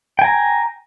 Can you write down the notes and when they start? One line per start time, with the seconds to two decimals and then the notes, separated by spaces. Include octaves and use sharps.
0.19 G5
0.22 G#5
0.24 A#5